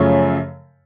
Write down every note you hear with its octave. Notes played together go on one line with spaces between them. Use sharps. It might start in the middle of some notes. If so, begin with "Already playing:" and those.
Already playing: F#2 C#3 F3 A3 C#4